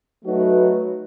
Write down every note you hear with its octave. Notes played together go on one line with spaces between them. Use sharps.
F#3 A3 D#4 F#4 B4